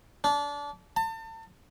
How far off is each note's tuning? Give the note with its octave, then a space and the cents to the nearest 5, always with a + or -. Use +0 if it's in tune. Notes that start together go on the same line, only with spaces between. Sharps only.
D4 -25
A5 +35